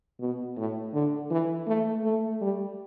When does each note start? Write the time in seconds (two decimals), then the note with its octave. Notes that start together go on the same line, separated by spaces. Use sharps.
0.20 B2
0.56 A2
0.93 D3
1.31 E3
1.67 A3
2.04 A3
2.41 G3